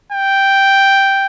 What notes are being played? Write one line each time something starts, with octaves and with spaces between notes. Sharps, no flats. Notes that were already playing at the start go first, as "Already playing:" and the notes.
G5